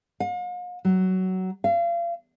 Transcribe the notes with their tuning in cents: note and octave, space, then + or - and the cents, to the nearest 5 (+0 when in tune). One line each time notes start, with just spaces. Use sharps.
F5 +45
F#3 +15
F5 -35